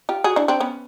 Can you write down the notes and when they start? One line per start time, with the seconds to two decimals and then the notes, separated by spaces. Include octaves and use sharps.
0.09 F4 G4
0.24 F#4 G#4
0.36 D4 E4
0.48 C4 D4
0.60 B3 C#4